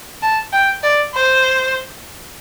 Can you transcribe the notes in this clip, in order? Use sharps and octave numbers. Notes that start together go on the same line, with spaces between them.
A5
G5
D5
C5